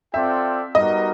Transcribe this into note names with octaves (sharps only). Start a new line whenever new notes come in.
C4 F4 A4 D5 E5 G5
G3 B3 D#4 F#4 A#4 D#5